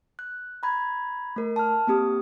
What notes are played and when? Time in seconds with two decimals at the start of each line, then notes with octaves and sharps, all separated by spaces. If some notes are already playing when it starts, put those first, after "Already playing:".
0.19 F#6
0.63 A#5 B5 G#6
1.36 A3 A#4
1.56 A5 F6
1.87 A#3 C4 G4 D#6